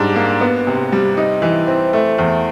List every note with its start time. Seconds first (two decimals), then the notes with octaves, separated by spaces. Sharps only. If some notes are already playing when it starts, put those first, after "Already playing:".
Already playing: G#2 G3 D4
0.16 A#3
0.41 B3
0.67 C3
0.92 G3
1.17 D#4
1.42 E3
1.67 C4
1.93 A3
2.18 E2